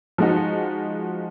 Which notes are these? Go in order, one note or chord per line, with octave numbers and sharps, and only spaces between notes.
F3 G#3 D#4 F#4